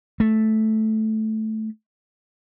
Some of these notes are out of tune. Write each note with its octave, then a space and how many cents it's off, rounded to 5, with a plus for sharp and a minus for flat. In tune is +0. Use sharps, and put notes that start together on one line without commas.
A3 -10